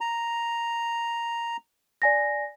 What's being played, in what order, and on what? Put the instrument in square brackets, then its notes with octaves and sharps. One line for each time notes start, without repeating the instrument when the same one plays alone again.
[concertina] A#5
[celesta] D5 G#5 A#6